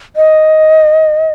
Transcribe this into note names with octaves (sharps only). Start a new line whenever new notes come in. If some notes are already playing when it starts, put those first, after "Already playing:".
D#5